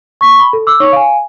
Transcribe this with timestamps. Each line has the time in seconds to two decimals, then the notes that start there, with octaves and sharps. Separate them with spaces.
0.21 C#6 B6
0.40 B5
0.53 A4
0.67 D6 E6
0.80 D#4 C#5 C#6
0.92 F5 G#5